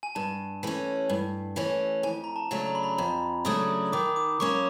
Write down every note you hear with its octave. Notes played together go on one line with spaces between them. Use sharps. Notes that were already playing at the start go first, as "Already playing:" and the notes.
G#5
G2 A5
E3 A3 C#4
G2
E3 A3 C#4
F2 G#5
A#5
A5
C#3 F#3 A3 D4
A#5
B5
A#5
F2 B5
C#3 F#3 A3 D4 D#6
D#3 D6
D6
F#3 A#3 C#4 C#6